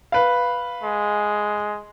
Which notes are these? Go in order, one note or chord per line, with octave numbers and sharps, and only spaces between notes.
B4 F5
G#3